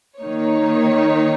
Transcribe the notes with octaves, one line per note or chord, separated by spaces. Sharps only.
D#3 A#3 D#4 C#5